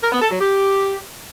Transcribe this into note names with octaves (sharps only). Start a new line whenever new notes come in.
A#4
B3
A4
F#3
G4